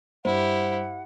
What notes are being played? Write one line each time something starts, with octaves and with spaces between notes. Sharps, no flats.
G2 E4 G4 C5 F#5